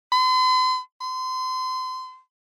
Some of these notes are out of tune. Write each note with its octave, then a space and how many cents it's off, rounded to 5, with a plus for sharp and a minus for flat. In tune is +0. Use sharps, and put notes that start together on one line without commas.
C6 -45
C6 -30